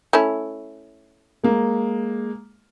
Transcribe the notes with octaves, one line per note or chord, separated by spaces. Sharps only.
A3 C#4 E4
G#3 A#3